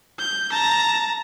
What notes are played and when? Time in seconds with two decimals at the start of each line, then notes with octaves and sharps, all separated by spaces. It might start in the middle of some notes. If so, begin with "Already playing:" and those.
0.19 G6
0.51 A5 A#5